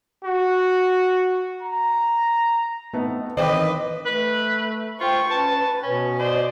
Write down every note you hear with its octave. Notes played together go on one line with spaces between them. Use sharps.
F#4
A#5
A3 B3 C4 D#4
D#3 E3 C4 B4 C5 D#5 G5 D6
A3 B4
F4 C5 G5 C#6
C#4 B4 A5
B2 C#4
C5 D5 D#5